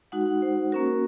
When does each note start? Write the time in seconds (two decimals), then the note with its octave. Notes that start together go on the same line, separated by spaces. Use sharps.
0.12 G#3 D#4 F#4 F#5
0.42 C5
0.72 A#3 C#4 F#4 A#4